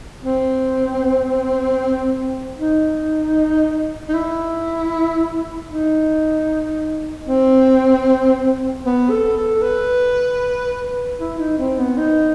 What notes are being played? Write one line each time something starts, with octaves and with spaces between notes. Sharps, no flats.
C4
D#4
D#4
E4
D#4
C4
B3
A4
A4
B4
E4
D#4
C4
B3
D#4